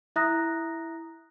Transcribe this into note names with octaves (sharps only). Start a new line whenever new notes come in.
E4 E5 A#5 D#6 F#6 A#6